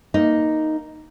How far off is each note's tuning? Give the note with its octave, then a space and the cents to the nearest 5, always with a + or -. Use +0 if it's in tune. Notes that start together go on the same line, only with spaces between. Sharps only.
A#3 +0 D#4 +0